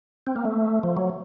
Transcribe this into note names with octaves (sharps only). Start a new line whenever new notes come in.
C4
A#3
A3
F3
F#3